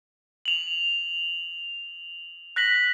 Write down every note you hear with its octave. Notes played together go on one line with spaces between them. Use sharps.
F7 F#7
F#6 A#6 B6 F#7